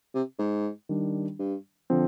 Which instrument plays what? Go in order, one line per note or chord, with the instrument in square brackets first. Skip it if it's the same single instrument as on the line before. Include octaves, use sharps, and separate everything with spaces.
[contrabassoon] C3
G#2
[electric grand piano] D#3 G3 D4
[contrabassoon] G2
[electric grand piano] D3 F3 C4